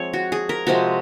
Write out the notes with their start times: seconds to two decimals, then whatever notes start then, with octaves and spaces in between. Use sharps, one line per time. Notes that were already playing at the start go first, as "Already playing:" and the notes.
Already playing: F3 G#3 C4 C#5
0.13 F#4
0.32 G#4
0.49 A#4
0.67 C3 F3 G#3 C4 F#4